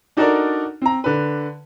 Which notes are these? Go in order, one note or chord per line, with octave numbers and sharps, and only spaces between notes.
D4 D#4 F#4 A4 A#4 D5
C4 A#5
D3 B4